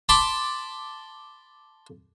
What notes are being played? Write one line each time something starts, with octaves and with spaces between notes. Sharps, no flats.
A5 B5 C6 D6